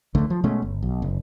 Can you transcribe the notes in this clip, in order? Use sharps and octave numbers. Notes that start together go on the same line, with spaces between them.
C#2 D3 A3
F3
B2 G#3 A3 C#4
G1
B1
F#1